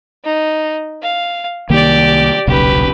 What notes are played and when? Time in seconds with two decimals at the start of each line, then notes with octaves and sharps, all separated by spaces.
0.24 D#4
1.02 F5
1.70 C2 D#3 A#3 G4 D5
2.47 D#1 B1 C#3 G4 B4